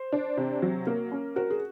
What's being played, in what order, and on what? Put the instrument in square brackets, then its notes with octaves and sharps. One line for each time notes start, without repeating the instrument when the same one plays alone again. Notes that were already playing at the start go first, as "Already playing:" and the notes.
Already playing: [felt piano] C5
[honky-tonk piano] D4
C3
F#3
A#3
C#4
[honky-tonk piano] F#4 [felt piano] A#4
[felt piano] G#4